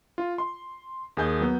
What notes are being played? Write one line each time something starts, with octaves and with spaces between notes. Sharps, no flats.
F4
C6
D#2 G#4 G#5 G6
F#3 B3